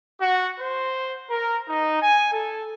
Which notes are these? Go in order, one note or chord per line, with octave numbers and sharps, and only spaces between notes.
F#4
C5
A#4
D#4
G#5
A4